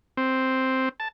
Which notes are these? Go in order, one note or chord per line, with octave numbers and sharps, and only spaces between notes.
C4
A5